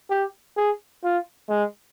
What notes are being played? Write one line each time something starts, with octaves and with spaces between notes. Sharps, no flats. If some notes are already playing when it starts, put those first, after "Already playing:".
G4
G#4
F4
G#3